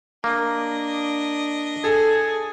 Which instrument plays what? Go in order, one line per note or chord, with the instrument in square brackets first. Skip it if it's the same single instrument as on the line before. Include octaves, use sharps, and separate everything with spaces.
[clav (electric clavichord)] A#3 [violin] D4 D#5
[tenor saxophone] G#4 [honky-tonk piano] A4